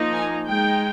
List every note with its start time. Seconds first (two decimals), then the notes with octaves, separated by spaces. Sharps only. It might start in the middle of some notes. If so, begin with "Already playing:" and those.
Already playing: F3 A#3 D#4
0.13 G#5
0.47 G#3 D#4 G5